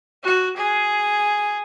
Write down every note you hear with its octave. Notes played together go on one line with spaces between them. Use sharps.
F#4
G#4